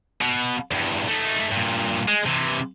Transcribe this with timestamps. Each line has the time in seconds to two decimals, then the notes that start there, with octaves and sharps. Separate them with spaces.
0.21 B2
0.71 E2 G2
1.07 A3 D#4
1.51 G2 A#2
2.08 G#3
2.26 C3 E3